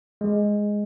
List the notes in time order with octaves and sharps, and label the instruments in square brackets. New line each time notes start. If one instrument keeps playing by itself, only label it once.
[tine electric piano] G#3